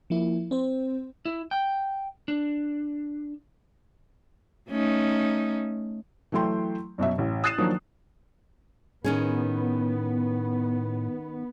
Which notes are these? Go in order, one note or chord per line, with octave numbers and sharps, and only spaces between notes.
F3 A#3 E4
C4 C5
E4
G5
D4
A3 C#4 D#4
E3 F#3 A3 G5 C6
F#2 B2 F#3 E5
A1
D#6 F#6 A6 C7 D#7 E7
D#3 F3 F#3 A#3 D4
A2 D#3 B3 C#4 G#4